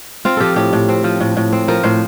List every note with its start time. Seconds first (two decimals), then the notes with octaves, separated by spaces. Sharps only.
0.25 C4 F4
0.37 F3 G4 A4
0.56 A2 G4
0.73 A2
0.89 C4
1.04 F3
1.21 A2
1.37 A2
1.53 C4
1.68 F3 A#4
1.83 A2 C5